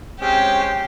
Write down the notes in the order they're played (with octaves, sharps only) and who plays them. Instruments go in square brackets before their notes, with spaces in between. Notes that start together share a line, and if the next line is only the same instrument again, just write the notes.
[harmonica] G#3 C4 C#4 [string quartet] G4